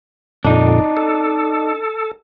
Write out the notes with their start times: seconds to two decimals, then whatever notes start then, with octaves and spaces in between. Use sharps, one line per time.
0.45 F2 A#2 D3 D4 D#4
0.97 A4